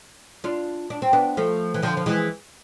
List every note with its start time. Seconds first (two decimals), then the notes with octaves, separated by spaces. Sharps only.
0.44 D4 F4
0.90 D4
1.02 C4
1.13 B3 D4
1.37 F3 A3
1.74 E3
1.82 D3 F3
1.97 F3
2.06 E3 G#3